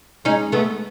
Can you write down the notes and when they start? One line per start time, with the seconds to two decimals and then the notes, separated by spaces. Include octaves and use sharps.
0.25 G#3 C#4 D#4
0.52 A3 B3